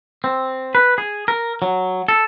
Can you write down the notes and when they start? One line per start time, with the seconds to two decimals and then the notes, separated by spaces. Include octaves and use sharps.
0.24 C4
0.75 B4
0.98 G#4
1.28 A#4
1.62 F#3
2.08 A4